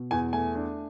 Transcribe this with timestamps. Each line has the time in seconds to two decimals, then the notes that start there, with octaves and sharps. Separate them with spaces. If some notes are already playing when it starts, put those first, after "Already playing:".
Already playing: B2
0.11 E2 G#5
0.33 A3 G#5
0.55 D4